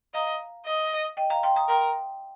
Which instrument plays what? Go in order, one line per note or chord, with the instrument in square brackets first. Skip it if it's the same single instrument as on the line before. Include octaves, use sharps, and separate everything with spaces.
[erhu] D#5 [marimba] F5 A#5
[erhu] D#5
[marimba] D#5 G5
F5 A#5
G5 C6
A#5 D#6
[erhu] A#4 [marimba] G5 C6